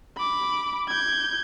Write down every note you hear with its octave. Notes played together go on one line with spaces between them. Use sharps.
B5 D6
G6 G#6